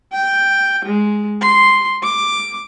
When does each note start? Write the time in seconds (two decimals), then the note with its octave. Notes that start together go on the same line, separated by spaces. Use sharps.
0.13 G5
0.85 G#3
1.42 C6
2.03 D6